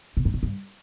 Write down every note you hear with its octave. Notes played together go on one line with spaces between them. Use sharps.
B2
G#2
A#2
G2